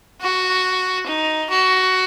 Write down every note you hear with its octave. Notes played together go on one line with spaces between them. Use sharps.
F#4
D#4
F#4